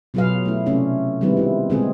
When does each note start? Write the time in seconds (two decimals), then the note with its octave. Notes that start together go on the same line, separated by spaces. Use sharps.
0.14 B2 F#3 F4 G#4 B4 F5
0.45 A3 E4
0.66 C3 A3 C#4 D4 F4
1.21 D#3 G3 G#3 B3 C4 E4
1.37 E4 F4
1.70 A#2 D3 G#3 C4 F4 G#4